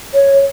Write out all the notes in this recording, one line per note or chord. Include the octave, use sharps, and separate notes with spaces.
C#5